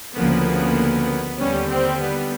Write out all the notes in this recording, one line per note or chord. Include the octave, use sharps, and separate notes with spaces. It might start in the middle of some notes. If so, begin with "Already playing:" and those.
D2 C#3 F3 A#3 B3
D#2 D3 G3 C#4
C4
B3